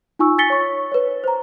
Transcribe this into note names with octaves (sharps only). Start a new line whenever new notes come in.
D#4 F4 G#5 C#6 E6
G#5 A6 B6 C#7 G7
C#5 C#6
B4 C#5
C5 A#5